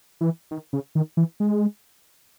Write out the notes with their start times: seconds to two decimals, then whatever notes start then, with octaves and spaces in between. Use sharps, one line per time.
0.21 E3
0.51 D#3
0.73 C#3
0.95 D#3
1.17 E3
1.40 G#3